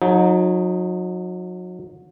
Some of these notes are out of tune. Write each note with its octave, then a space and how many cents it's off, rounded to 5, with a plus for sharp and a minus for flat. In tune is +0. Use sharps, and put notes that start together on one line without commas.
F#3 -35 D#4 +0 G#4 +30